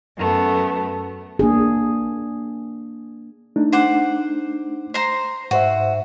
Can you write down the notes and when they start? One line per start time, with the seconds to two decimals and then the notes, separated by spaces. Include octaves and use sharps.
0.18 F#2 A3 B3
1.39 A#3 D4 G#4
3.56 A3 D4 D#4
3.72 C5 F#5 D6
4.94 C5 A#5 C6
5.51 G#2 F#4 C5 E5